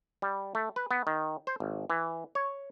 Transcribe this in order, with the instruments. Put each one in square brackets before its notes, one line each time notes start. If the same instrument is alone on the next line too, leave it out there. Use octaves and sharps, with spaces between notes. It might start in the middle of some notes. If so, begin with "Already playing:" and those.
[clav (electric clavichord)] G3
A3
B4
B3
D#3
C5
G#1
E3
C#5